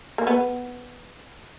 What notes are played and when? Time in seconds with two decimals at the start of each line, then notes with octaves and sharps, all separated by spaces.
0.18 A#3
0.27 B3